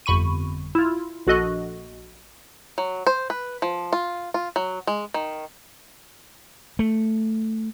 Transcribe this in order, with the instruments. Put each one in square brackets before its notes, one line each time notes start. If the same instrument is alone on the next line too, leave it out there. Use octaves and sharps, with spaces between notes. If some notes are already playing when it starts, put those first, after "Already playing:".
[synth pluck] G1 F2 B5 C#6 D#7
E4 F4
A#1 F#4 A4 D#5 F#6
[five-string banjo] F#3
C5
B4
F3
F4
F4
F#3
G#3
D#3
[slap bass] A3